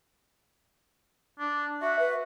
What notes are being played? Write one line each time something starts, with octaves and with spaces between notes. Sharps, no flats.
D4
F#4 E5
B4